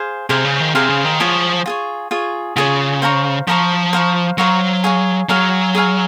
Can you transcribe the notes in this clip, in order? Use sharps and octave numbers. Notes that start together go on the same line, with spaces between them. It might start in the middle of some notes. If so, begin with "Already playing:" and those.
Already playing: G#4 C5 F5 C6
C3 G#4 C5 F5 C6
C#3
D#3
C3 G#4 C5 F5 C6
C#3
D#3
F3 F4 G#4 C#5
F4 G#4 C#5
F4 G#4 C#5
C#3 F4 G#4 C#5
C5 F5 A#5 C#6
F3 C5 F5 A#5 C#6
C5 F5 A#5 C#6
F#3 C5 F5 A#5 C#6
G#4 C#5 F5 G#5
F#3 G#4 C#5 F5 G#5
G#4 C#5 F5 G#5